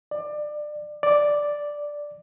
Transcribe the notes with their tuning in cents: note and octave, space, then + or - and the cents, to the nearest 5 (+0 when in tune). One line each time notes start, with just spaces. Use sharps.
D5 +25
D5 +0